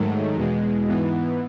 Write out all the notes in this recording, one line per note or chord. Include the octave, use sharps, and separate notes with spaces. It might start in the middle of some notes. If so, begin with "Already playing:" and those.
Already playing: G#2 D#3 F#3 A3
E2 B2 G#3
G#2 E3 B3